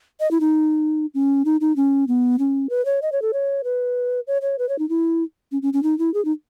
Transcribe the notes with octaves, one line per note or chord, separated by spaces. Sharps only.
D#5
E4
D#4
C#4
D#4
D#4
C#4
B3
C#4
B4
C#5
D#5
C#5
A4
C#5
B4
C#5
C#5
B4
C#5
D#4
E4
C#4
C#4
C#4
D#4
E4
G#4
D#4